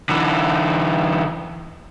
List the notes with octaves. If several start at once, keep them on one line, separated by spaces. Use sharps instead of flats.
D3 E3